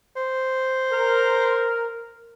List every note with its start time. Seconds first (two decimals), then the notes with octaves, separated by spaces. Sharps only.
0.16 C5
0.91 A#4